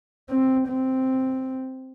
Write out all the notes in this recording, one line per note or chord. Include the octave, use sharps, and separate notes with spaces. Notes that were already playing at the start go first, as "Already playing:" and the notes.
C4
C4